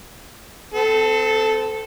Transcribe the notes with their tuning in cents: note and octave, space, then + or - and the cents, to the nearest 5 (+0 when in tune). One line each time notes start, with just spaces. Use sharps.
C4 -30 A4 +0